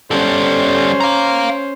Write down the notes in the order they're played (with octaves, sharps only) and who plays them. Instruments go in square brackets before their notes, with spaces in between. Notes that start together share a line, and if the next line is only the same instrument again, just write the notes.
[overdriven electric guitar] G3 A4 [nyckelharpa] C#4 C5
[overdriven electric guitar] F5 A#5